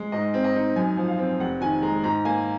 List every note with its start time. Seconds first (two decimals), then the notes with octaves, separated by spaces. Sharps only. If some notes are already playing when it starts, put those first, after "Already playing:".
Already playing: G#3
0.12 G#2 D#5
0.34 C4
0.44 D#5
0.56 D#4
0.76 F#2 G#5
0.97 F3
1.08 F5
1.19 C4
1.40 F1 F#5
1.61 D#3 G#5
1.82 G#3 A#5
2.04 G#2 A#5
2.25 A#3 G#5